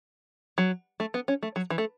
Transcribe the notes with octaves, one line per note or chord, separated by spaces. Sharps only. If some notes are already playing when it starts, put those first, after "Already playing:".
F#3
A3
B3
C#4
A3
F#3
E3
A3